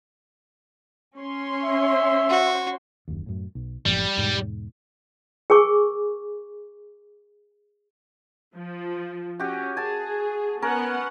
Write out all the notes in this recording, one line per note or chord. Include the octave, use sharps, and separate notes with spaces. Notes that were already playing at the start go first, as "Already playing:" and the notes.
C#4 C#5 C6
E5
F#4
F#1 D#2
F#2 A2
B1
F#1 A2 F3 G3
E2 G#2 B2
G#4 A#4 G#5 C#6 D6
F3
C#4 F#4 G4
G#4 G#5 A5
B3 C#4 A#4 F#5